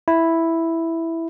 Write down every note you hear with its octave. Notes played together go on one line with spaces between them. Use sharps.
E4